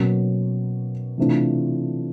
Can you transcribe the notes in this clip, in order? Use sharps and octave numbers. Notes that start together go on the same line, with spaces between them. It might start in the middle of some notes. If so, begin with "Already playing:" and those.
Already playing: B2 F#3 A#3 C#4
C3 E3 A3 D4 F4